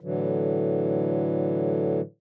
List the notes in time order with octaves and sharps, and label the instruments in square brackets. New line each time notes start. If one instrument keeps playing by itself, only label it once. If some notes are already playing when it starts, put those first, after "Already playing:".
[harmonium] A2 D3 E3 F#3